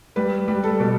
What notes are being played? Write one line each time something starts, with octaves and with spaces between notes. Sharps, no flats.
G3 B4
G3
A4
B2